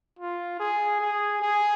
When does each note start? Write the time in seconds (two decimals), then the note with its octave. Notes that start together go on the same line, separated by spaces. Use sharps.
0.19 F4
0.60 G#4
1.01 G#4
1.42 G#4